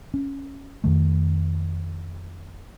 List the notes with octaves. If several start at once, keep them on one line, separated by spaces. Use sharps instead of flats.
C#4
F2 D#3 A3